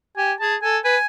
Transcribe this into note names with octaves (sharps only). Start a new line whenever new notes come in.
G4 G#5
G#4 A5
A4 G#5
B4 G#5